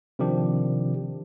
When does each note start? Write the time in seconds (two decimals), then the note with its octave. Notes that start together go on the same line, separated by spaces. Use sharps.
0.19 C3 D#3 F3 D4 G4